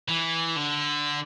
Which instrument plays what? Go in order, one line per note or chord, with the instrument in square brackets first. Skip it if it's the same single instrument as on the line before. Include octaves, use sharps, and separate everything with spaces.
[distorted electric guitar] E3
D3